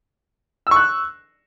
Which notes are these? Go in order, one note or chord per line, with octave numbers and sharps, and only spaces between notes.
C#6 E6 F#6